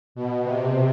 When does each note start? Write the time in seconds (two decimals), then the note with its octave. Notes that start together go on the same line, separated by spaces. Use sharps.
0.15 B2
0.44 C3